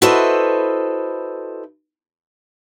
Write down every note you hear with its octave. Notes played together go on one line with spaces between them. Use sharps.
E4 F#4 A4 B4 C5 D#5